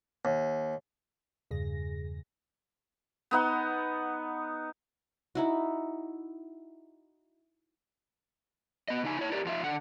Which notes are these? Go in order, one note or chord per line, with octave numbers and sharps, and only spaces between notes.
D#2
E2 G2 C#3 G#4 A#6
B3 D#4 F#5
D#4 E4 F#4
B3 D#5
C#3 D#4 G#5
E4 C#5
G4 G#4 A#4 D5
F2 F4 E5
D3 F#5